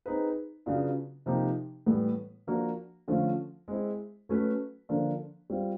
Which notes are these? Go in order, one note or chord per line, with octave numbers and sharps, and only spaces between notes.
C4 D#4 G#4 B4
C#3 F#3 B3 D4 F4
C3 F3 A#3 D#4 G4
A2 E3 G3 B3
F3 A#3 D4 F#4
D3 F3 A3 C#4 F4
G#3 C4 E4
F#3 A3 C#4 F#4 B4
D3 F3 A#3 D4
G3 C4 F4